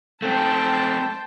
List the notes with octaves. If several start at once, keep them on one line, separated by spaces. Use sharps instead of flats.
A3 C4 C5 G5 A5